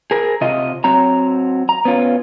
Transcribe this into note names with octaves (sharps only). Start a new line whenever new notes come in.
G#4 A#4
C3 F4 D#5
F#3 C4 A#5
A#5
B3 C#4 F4